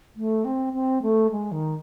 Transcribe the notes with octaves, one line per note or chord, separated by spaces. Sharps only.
A3
C4
C4
A3
G#3
D#3